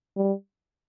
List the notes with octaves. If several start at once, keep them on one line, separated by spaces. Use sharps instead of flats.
G3